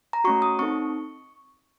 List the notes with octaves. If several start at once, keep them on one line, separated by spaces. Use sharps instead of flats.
A#5
A3 C#4 F#4 C#6
D#6
C4 D#4 A4 C#6